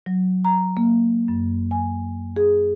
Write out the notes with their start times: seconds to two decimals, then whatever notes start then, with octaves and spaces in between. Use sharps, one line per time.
0.06 F#3
0.45 A#5
0.77 A#3
1.28 F#2
1.71 G#5
2.36 G#4